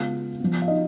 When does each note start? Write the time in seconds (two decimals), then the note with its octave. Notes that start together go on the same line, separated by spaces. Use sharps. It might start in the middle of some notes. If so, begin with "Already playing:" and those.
Already playing: C#3 G#3 B3 F4 F5
0.40 F3 B3
0.62 F5
0.68 D#4 D#5